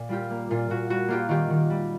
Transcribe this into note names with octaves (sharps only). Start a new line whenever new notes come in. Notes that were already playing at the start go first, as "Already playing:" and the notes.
Already playing: A#2
G3 F4 G4
A#3
A#2 F4
A#2 F#4
G3 F#4
A#3 F4 G4
D#3 F4 G4
D#3
G3